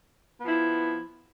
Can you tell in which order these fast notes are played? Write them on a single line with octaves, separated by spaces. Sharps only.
B3 F3 E4